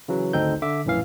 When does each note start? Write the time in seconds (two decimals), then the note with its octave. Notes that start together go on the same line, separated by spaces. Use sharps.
0.08 C#3 E3 F#3
0.33 G#1 D2 C4 D#4 A4 G6
0.62 D3 E5 D6
0.85 A#1 F#2 A2 E3 F5